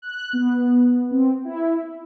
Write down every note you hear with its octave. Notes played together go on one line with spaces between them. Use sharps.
F#6
B3
C4
E4